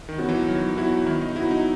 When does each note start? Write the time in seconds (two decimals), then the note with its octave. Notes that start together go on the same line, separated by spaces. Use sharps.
0.09 D#3
0.18 F#3 B3 F#4
0.29 E3
0.48 D#3 F#3
0.77 F#3 B3 E4 F#4
1.06 D#3 E4
1.21 D#4
1.35 F#3 E4
1.38 B3 F#4
1.51 D#4